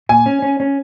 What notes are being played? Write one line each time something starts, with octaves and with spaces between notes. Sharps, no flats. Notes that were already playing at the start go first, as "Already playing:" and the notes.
A#2 G#5
C#4
C#4
C#4